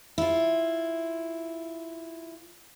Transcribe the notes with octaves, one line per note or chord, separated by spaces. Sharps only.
E4 F4